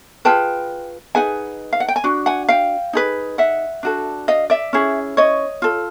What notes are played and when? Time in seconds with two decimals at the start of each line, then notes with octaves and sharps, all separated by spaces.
0.25 F4 G#4 B4 G5 A5
1.15 D#4 G#4 B4 F#5 G#5
1.73 F5
1.80 F#5
1.88 G5
1.96 G#5
2.04 D4 F#4
2.26 F#5 G#5
2.49 F5 G5
2.93 D#4 G#4 B4
3.38 E5 F#5
3.83 D4 F#4 A4
4.28 D#5 F5
4.50 D5 E5
4.73 C#4 E4 G#4
5.17 C#5 D#5
5.62 F4 A4